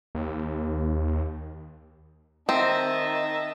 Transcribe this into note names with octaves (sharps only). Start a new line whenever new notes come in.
D#2
D#3 C4 D#5 E5 A5